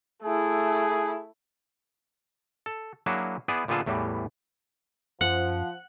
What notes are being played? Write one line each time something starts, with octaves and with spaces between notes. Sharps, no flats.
A3 E4 G#4
A4
F#3 A#3 D4 E4 F#4 G#4
B3 E4 G#4 D5
A#2 D3 B3 F4 G#4 A4
E2 A2 E3 G3
F#2 F3 F#5